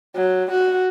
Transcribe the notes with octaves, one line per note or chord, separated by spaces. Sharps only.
F#3
F#4